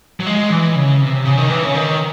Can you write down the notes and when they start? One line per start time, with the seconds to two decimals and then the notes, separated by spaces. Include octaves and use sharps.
0.20 F#3
0.27 G#3
0.50 E3
0.75 C#3
1.01 C3
1.25 C#3
1.37 D#3
1.50 E3
1.63 C#3
1.75 D#3